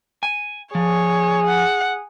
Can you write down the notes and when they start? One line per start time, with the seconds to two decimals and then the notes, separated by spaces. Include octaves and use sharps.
0.23 G#5
0.75 F3 G#4 C#5
1.46 F#5